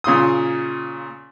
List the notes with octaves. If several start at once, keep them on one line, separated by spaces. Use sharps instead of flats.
A#2 C#3 C6 D#6